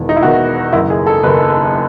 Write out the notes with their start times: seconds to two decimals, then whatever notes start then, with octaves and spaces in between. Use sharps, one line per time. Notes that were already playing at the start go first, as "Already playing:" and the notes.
Already playing: E1 E2 D#3
0.09 D#4
0.16 E4
0.23 E1 E2 D#3 F#4
0.73 F#1 F#2 D#3 E4
0.90 G#4
1.07 A4
1.23 F#1 F#2 D#3 B4